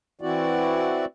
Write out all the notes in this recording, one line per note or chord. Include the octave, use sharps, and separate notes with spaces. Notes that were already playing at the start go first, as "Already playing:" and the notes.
E3 C4 E4 F#4 D5